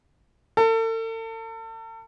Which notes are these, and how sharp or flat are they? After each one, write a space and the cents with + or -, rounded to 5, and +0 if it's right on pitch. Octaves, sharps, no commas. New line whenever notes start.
A4 +40